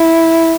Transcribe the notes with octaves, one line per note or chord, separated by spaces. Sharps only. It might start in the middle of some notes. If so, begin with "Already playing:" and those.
Already playing: E4